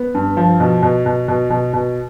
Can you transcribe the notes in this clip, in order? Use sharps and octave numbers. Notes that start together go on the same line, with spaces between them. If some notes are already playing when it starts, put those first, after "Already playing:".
Already playing: B3
G2
F3
B2
B2
B2
B2
B2
B2